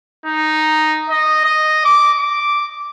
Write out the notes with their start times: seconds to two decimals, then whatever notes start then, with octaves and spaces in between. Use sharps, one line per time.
0.26 D#4
1.09 D#5
1.44 D#5
1.85 D6
2.19 D6